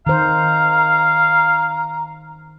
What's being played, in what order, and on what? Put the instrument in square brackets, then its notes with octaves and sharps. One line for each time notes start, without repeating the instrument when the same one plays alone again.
[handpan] D#3 C5 [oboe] F5 [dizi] A#5